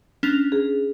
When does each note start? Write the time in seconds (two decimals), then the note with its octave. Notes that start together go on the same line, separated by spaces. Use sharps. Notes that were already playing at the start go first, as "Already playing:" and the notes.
0.23 C#4 D4 F7
0.52 G#4